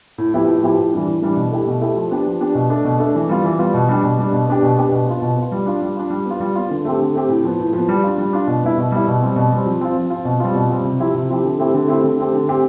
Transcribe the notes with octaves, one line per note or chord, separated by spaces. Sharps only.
A2
F3 B3 E4 G4
A2
F3 B3 E4 G4
A2
E3 G3 D4
A2
E3 G3 D4
B2
A3 E4 G4
B2
A3 E4 G4
F3
B3 D4 G4
F3
B3 D4 G4
B2
A3 D4
B2
A3 D4
E3
G3 B3 F4
E3
G3 B3 F4
B2
G3 D4 G4
B2
G3 D4 G4
B2
B3 D4 G4
B2
B3 D4 G4
B2
B3 F4
B2
B3 F4
G3
D4 F4
G3
D4 F4
G3
B3 F4
G3
B3 F4
D3
A3 C4 G4
D3
A3 C4 G4
A2
F3 B3
A2
F3 B3
G3
D4 F4
G3
D4 F4
B2
G3 B3 E4
B2
G3 B3 E4
B2
G3 C4
B2
G3 C4
F3
C4 F4
F3
C4 F4
B2
G3 C4 F4
B2
G3 C4 F4
C3
F3 C4 E4 G4
C3
F3 C4 E4 G4
D3
A3 C4 E4 G4
D3
A3 C4 E4 G4
D3
A3 C4 G4
D3
A3 C4 G4